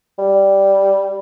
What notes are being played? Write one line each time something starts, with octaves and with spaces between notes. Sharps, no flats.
G3